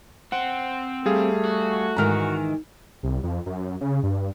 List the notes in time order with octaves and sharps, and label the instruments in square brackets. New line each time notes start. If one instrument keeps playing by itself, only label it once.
[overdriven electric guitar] C4 [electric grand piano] F#5
[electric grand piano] G3 G#4 F5 [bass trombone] A3
[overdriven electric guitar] F#4
[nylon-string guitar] G#2 D#3 E3 [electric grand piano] A#5 F6
[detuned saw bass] C2
F2
F#2
C#3
G2